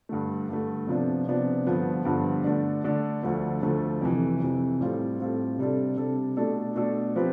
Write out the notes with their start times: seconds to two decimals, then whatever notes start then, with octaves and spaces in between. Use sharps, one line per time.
0.09 G2 D3 A3
0.49 G2 D3 A3
0.87 C3 F3 B3 D4
1.27 C3 F3 B3 D4
1.67 G2 D3 F3 B3
2.05 G2 D3 F3 B3
2.44 D3 A3 D4
2.84 D3 A3 D4
3.23 D2 D3 F3 A3
3.62 D2 D3 F3 A3
4.01 F2 C3 E3
4.40 F2 C3 E3
4.80 A2 G3 C4 F4 A4
5.19 A2 G3 C4 F4 A4
5.58 C3 G3 D4 A4
5.97 C3 G3 D4 A4
6.37 B2 A3 D4 A4
6.76 B2 A3 D4 A4
7.16 F3 C4 G4 B4